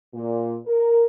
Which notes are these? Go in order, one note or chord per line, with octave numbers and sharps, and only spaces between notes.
A#2
A#4